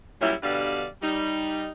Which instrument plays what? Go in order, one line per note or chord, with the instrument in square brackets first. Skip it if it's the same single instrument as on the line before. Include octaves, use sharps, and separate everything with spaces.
[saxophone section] A#2 F#3 G3 C#4 E4
G2 B2 D3 G3 D5 F5
G3 D#4